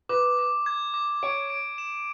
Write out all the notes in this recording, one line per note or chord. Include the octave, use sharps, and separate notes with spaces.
B4 D6
D6
G#6
D6
C#5 D7
D7
E7